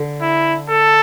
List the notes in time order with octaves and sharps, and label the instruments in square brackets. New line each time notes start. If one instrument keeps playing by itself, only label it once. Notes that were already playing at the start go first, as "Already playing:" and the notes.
Already playing: [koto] D3
[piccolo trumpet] E4
A4